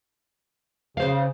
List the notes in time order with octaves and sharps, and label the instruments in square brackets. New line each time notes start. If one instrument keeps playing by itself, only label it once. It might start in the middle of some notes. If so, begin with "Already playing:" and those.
[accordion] C#3 [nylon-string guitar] C5 F5